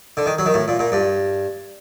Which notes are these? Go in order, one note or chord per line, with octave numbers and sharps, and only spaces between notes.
D3
D#3
F#3
D#3
A2
A#2
A#2
G2